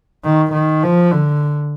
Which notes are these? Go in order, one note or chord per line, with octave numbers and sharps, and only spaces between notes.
D#3
D#3
F3
D3